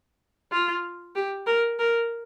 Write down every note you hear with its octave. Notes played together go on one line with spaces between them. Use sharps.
F4
G4
A#4
A#4